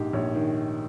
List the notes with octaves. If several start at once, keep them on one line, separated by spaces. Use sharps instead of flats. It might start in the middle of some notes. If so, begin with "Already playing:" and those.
Already playing: A#1 G#2 G4
A#1 C#5
D#3